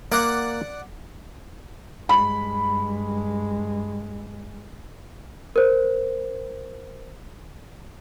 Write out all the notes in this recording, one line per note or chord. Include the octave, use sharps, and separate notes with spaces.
A#3 D5 F#5
G2 G#3 B5
A#4 C5